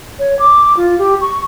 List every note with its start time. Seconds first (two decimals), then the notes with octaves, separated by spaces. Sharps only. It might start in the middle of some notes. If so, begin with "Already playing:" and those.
0.19 C#5
0.39 D6
0.77 F4
0.99 G4
1.21 C#6